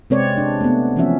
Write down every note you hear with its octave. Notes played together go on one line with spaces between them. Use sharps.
C3 G#3 C4 B4 C#5 D5
D4
A3 B3
E3 F3 C4 C#4 E5